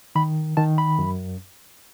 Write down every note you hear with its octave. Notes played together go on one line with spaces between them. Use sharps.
D#3 B5
D#3 A5
B5
F#2